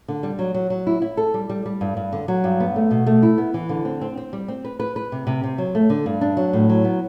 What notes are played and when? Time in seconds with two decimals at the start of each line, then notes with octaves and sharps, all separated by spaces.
0.08 D3
0.23 G3
0.39 F#3
0.54 F#3
0.70 F#3
0.87 E4
1.02 E4
1.17 A4
1.34 G3
1.50 G3
1.66 G3
1.81 G2
1.97 G2
2.13 D3
2.28 F#3
2.44 G2
2.60 B3
2.76 A3
2.91 B2
3.07 A3
3.23 E4
3.38 B3
3.54 E3
3.69 D3
3.85 C4
4.01 C4
4.18 C4
4.33 G3
4.48 C4
4.65 B4
4.80 B4
4.96 B4
5.12 C3
5.27 C3
5.44 C3
5.58 F#3
5.75 A3
5.90 D3
6.06 G2
6.21 D4
6.37 F#3
6.53 A2
6.69 F#3
6.84 B3